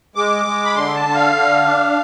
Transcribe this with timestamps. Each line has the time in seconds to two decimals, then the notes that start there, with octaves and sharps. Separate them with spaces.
0.15 G#3 D6
0.45 G#3
0.65 B5
0.75 D3 C6
0.95 A5
1.05 D3
1.15 F5
1.35 D3
1.64 D4